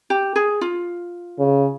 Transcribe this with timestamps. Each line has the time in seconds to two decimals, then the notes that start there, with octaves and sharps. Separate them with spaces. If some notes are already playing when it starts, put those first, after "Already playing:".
0.10 G4
0.36 G#4
0.61 F4
1.39 C#3